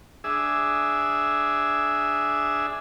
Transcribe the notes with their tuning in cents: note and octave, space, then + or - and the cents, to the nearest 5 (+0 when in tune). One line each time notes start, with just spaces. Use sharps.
D4 +0 G#4 +0 E5 +0